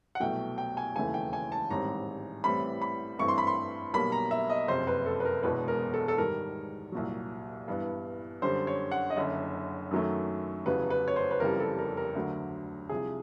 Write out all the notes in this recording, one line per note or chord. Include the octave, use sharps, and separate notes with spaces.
F#5
C2 B2 F#3 A3 G5
G5
G#5
E1 D#2 C#3 E3 A3 G#5
G5
G#5
A5
A1 G#2 D#3 G3 C4 A#5
A1 A2 E3 G3 C4 B5
B5
G2 E3 A3 C4 C#6
C6
B5
C6
B1 B2 G3 A#3 B5
A#5
E5
D#5
F#1 F2 C3 C5
B4
A4
B4
A#4
E1 E2 B2 G#3 B4
A#4
A4
A4
G#2 D#3 G3 A#4
C2 A#2 F#3
G2 E3 G3 B3 D4
F#2 D3 G3 C5
C#5
F#5
D#5
F#1 F#2 D3 E5
F#2 D#3 F#3 A3
F1 E2 C#3 F#3 B4
B4
C#5
C5
B4
F1 F2 C#3 E3 G3 A#4
A4
A#4
A#4
D2 D3 F#3
C2 C3 F3 G#4